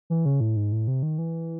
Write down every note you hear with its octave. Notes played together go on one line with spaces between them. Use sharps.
E3
C#3
A2
G#2
A2
C3
D#3
E3